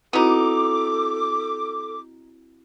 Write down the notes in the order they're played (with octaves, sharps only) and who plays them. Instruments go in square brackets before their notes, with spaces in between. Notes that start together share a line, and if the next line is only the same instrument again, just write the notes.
[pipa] B3 D#4 [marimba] C4 E4 F#4 [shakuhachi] A4 [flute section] D6